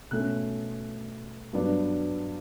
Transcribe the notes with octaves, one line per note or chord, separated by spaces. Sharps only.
B2 A3 C#4 F#6
G2 F#3 B3 D4